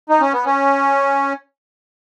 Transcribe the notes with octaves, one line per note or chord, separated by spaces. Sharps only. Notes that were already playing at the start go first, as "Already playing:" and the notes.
D#4
C#4
B3
C#4